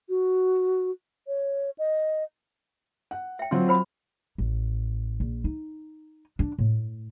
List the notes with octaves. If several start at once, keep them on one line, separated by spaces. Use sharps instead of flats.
F#4
C#5
D#5
F#5
E5 G5
F#3 C4 F4
F#4 C5 B5
A1
A#1
D#4
D4
A2